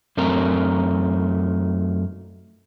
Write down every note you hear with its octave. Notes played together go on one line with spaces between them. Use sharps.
F#2 A3 C4 A#4